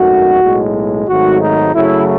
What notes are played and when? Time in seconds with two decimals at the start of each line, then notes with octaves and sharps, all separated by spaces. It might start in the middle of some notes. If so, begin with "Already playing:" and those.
Already playing: G#1 F#2 D#3 A3 F#4
0.41 B1 A2 G#3
1.07 G#1 G#2 D#3 F#3 A3 F#4
1.41 D#4
1.73 F#2 C#3 F#3 A3 E4